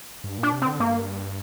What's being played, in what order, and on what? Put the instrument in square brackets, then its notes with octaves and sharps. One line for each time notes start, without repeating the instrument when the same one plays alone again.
[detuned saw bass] G2
[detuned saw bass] A#2 [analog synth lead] D4
[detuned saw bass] C3
[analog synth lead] C4
[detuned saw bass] D3
[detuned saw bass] G2 [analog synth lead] A#3